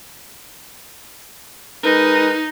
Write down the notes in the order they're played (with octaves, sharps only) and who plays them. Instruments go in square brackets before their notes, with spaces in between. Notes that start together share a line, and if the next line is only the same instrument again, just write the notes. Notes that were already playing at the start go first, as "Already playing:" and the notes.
[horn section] G#3 A#4 B4 [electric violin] D#4